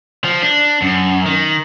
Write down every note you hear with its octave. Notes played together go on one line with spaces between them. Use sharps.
F3
D4
F#2
D#3